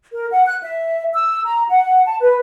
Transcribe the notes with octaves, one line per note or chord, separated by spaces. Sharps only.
A#4
F#5
F#6
E5
E6
A#5
F#5
A5
B4